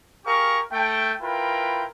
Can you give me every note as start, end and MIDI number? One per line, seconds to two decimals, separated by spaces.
0.25 0.59 67
0.25 0.59 68
0.25 0.59 70
0.25 0.59 77
0.25 0.59 85
0.71 1.12 57
0.71 1.12 79
1.21 1.84 64
1.21 1.84 65
1.21 1.84 70
1.21 1.84 71
1.21 1.84 79